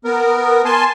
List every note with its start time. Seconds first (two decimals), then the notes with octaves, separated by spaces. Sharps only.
0.05 B3 A#4
0.65 G#5 A5 C6